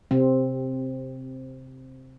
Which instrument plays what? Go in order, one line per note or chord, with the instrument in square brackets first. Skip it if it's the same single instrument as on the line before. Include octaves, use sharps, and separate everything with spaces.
[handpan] C3 C4